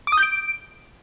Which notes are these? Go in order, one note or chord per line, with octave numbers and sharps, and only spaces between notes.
D6
D#6
G6
D7